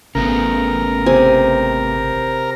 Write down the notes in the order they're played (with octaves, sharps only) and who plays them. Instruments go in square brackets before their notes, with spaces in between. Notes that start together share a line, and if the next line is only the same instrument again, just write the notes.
[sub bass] G#1 [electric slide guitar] C#3 A3 B3 [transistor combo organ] A#4
[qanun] C3 G#5